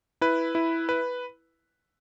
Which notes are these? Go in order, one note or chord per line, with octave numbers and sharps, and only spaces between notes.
E4 B4
E4
B4